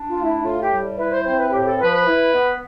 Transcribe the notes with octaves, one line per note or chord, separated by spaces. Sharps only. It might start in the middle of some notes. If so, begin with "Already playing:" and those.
Already playing: D4
F4
A3
E4
A2 F4
G4
G3
E4 B4
C5
C4 C5
B4
A2 G4
A4
F3 B4
B4
E4
B3